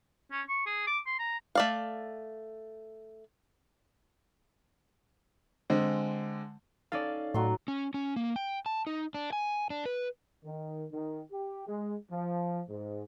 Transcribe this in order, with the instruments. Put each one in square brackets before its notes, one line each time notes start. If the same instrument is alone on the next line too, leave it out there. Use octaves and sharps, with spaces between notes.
[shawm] C#4
C#6
G#4
D6
C6
A#5
[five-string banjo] A3 D5 F5
[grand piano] D3 G#3 C4
[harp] C#4 D#4 A4 [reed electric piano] D5 F5
[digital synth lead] A2 [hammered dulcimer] F#3 C6
[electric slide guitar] C#4
C#4
A#3
G5
A5
D#4
D4
G#5
D4
B4
[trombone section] D#3
D#3
G4
G#3
F3
G#2